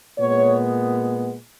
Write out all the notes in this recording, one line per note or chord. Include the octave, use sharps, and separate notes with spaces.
A#2 G#3 B3 C#5